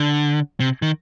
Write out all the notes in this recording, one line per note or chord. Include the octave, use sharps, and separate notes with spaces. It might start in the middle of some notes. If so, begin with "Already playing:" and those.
Already playing: D3
C3
D#3